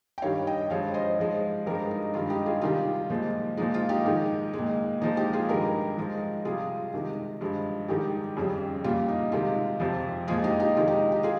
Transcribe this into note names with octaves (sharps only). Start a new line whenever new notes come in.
G5
G2 D#3 G3 C#5 F5
D#5 G5
G2 F3 G#3 C#5 F5
C5 D#5
G#2 F3 G#3
G2 F3 G#3 G4 A#4
D#4
G2 D#3 G#3 F4
D#4 G4
F4 G#4
C3 D#3 G3 F4
A#2 F3 G#3
A#2 F3 G#3 D#4
F4
D#4 G4
G#2 D#3 G#3
G#3
A#2
A#2 F3 G#3 D#4
D#4 G4
F4 G#4
G2 D#3 G#3 G4 A#4
G#2 F3 G#3
C3 G3 F4 G#4
C3 D#3 G#3
G2 F3 G#3
G#2 D#3 G3 D#4 G4
F2 C#3 G3
A#2 G3 F4
D#4
C3 D#3 G#3 F4
F2 C3 F3
A#2 F3 G#3 F4 G#4
D#4 G4
D#4 G4
C3 D#3 G#3 F4
D#4 G4
D#4 G4
F4 G#4